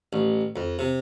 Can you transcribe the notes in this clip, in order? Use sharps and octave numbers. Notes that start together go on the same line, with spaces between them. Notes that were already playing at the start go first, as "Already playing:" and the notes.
A1
F2
C3